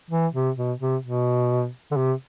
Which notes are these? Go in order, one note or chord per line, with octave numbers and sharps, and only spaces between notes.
E3
C3
B2
C3
B2
D3
C3